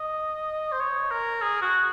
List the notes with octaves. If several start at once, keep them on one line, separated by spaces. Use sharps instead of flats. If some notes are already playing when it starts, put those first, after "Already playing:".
Already playing: D#5
C5
C#5
A#4
G#4
F#4